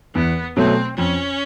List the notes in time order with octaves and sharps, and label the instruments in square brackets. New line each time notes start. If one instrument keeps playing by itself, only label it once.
[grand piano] E2 [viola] B3
[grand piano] B2 F#3 A3 [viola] C4
[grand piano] F2 [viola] C#4